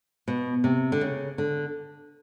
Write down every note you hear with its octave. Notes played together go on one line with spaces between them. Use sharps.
B2
C3
D3
C#3
D3